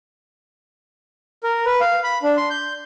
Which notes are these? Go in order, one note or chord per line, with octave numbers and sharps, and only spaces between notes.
A#4
B4
F5
B5
D4
C6
G6